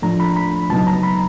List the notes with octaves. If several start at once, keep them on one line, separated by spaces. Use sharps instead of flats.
A2 F3 A3 D4 A#5
B5
B5
C#2 B2 F#3 B3 D#4 A5
A#5
B5